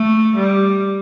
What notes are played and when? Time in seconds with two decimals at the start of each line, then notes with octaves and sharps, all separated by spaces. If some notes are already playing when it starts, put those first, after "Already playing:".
Already playing: A3
0.36 G3